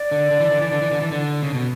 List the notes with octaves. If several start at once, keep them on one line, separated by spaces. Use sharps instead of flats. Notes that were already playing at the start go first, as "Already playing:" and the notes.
Already playing: D5
D3
D3
E3
D3
E3
D3
E3
D3
E3
D3
C#3
B2